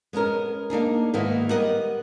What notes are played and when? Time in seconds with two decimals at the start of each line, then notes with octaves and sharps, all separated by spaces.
0.13 G#3 B3 C#4 A#4
0.70 A#3 D4 D#4 G#4
1.14 G#2 D#3 A#3 B3 E4 F#4
1.50 G3 B3 A#4 D#5 F#5